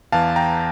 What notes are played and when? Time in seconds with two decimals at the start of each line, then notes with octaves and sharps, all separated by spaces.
0.12 E2 E3 F5 A5
0.36 G5 A#5